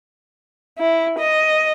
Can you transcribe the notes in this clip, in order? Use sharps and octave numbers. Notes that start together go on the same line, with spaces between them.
E4
D#5